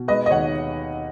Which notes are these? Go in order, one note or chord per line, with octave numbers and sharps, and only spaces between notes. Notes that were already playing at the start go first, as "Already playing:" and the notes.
Already playing: B2
G#3 B4 D#5
D#5
D#2 C#5 F#5